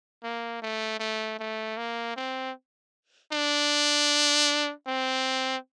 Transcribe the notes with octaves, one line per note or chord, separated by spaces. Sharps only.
A#3
A3
A3
A3
A#3
C4
D4
C4